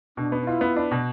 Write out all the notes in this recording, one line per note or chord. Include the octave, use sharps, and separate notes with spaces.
B2 D4
B3
D4
E4 F4
B3
D4
B2